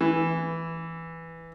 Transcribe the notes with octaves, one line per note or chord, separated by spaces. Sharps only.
E3